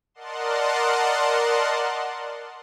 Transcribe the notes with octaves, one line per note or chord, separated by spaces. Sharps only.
A#4 D5 D#5 F#5 A5 C6